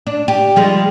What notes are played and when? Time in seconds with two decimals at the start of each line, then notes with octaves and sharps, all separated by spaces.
0.07 D4
0.28 G4
0.56 F3 G3 G#3